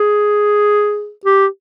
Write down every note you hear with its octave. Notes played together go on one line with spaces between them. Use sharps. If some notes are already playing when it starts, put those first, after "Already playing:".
Already playing: G#4
G4